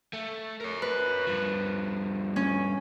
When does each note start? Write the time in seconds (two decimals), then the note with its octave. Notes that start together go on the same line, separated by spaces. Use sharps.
0.13 A3
0.61 A#4 C#5
0.82 B4
1.27 G2 F3
2.36 C#4